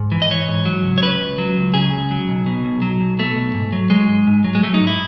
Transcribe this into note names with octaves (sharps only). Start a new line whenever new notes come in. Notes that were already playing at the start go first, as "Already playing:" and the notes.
Already playing: G#2
E3
D#5
E3 C#5
G#2
F#3
C#2
C#5
C#3 B4
C#2
F#3
C#2
C#3 G#4
C#2
F#3
B1
B2
B1
F#3
B1
B2 A3
B1
G#2
F#3
F#3 G#3
G#2
G#2
F#3
G#3
F#3 A3
D#4
G#2
E4